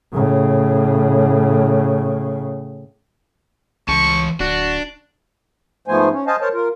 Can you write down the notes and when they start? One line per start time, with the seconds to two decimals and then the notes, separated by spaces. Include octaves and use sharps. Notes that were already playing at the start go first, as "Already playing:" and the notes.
0.13 A2 C#3
3.88 C#2 E3 A5 C#6
4.40 D1 D4 F#4
5.88 G#2 F3 A3 B3 C5 G#5
6.12 C#4
6.27 C5 D#5 F5 G#5 A5
6.41 A#4 C5 C#5 A5
6.53 F4 A#4